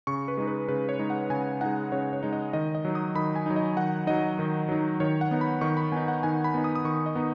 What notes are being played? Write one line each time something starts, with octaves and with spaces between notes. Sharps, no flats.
C#3 C#6
B4
G#3 D#4
B4
C#3 B4
C#5
G#3 D#4
F#5
C#3 G#5
G#3 D#4 F#5
C#3 C#5
C#5
G#3 D#4
D#5
D#3 D#5
D#5
F#3 D#4
D#6
D#3 B5
G#5
F#3 D#4
D#5
D#3 F#5
F#3 D#4 D#5
D#3
F#3 D#4
D#3 C#5
F#5
B3 D#4
B5
D#3 C#6
B5
B3 D#4 G#5
F#5
D#3 G#5
B5
B3 D#4
D#6
D#6
D#3 C#6
D#5
B3 D#4